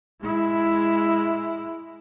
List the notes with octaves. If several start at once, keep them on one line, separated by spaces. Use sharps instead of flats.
G#3 E4